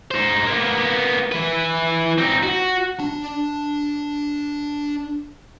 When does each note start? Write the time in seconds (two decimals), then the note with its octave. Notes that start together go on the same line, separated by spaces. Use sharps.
0.11 D#4 C5
0.47 A#3 B3
1.32 E3 B4
2.18 C4 D#4
2.43 F#4
2.99 D4 A5